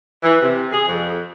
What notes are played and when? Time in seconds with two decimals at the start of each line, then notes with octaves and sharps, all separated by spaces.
0.23 E3
0.42 C3
0.72 G#4
0.88 F2